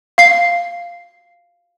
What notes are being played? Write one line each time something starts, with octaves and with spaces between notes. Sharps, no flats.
F5 C7